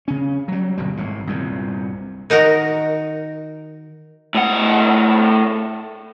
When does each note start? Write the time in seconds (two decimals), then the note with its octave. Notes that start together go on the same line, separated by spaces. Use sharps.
0.08 C#3 C#4
0.48 F#3 G3
0.78 G1 B2 G3
0.97 G#1 A2
1.27 C2 G2 A#2
2.30 D#3 D#4 F#4 A#4
4.35 A2 F#5